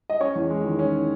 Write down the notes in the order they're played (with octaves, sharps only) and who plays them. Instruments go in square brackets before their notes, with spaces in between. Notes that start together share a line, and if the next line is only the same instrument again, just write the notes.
[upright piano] D#5
C#4 C#5
E2
G#3
D#3
C#4